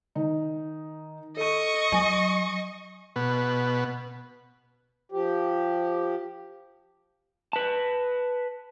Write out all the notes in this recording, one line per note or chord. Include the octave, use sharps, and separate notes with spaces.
D#3 D#4
A4 D#5 C#6 D#7
F#3 G#5
B2
F3 G4
B4 A5